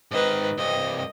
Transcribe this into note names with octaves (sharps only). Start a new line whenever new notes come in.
G#2 D#3 B4 D#5
C2 G2 D#5